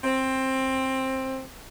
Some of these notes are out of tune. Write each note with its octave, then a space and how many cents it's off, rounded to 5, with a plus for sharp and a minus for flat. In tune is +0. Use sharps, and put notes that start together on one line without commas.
C4 +15